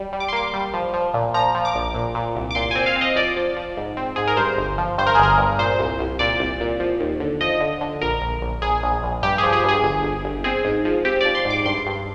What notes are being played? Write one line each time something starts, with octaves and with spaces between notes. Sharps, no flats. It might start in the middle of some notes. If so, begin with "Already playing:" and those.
Already playing: G3
G3
D6
C6
A#3 D6
G3
F3
F3
A#2
F3 A#5
F3
D6
A#1
A#2
A#2
C2
D6
A#2 C6
C4 G#5
F5
C4
D#5
F3 D5
F3
F3
G#2
C4
G#2 G#4
A#4
G2 C5
G1
F3
G2 C5
A#4
G1 G#4
A#4
G2
A#2 C5
C2
C2
A#2 D5
C2
A#2
F3
D#2
D3
F3 D#5
D3
D3
A#1 A#4
A#1
A#1
A#1 G#4
A#1
A#1
G2 G4
F3 G#4
G#4
G2
G#4
G1
G1
G1
C4 G#4
G#2
F3
C4 G4
F3 D5
C6
G#2
D6
G2 C6
G2